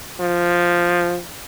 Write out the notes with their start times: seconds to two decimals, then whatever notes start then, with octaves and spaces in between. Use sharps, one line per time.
0.20 F3